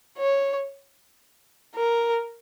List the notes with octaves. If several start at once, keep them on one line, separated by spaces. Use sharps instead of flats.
C#5
A#4